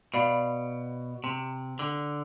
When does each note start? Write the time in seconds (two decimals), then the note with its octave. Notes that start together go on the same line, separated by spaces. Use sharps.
0.14 B2 D5 F5 B5
1.24 C3
1.79 D3